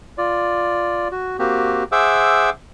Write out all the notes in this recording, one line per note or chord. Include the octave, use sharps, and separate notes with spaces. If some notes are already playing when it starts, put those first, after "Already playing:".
F4 D5
F#4
A#3 C4 F#4 G4
G#4 C5 E5 F#5 D6 E6